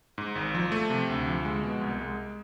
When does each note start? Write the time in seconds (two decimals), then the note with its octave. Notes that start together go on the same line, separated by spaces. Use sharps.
0.18 G#2
0.35 G#1
0.55 F3
0.72 A3
0.90 C3
1.09 D2
1.27 F3
1.45 G#3
1.63 B2
1.81 C2
2.01 G#3